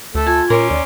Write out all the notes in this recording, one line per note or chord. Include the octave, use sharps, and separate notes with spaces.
D2 A3 A4
F4 G#5
A#2 C#4 A#4 C6 D6
D#2 D5